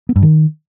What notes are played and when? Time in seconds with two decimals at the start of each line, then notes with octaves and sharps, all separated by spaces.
0.09 B3
0.16 G2
0.22 D#3